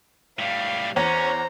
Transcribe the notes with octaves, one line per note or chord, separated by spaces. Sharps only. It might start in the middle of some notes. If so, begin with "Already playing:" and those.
A2 G3 F5
E2 C#4 C5 C#5 A#5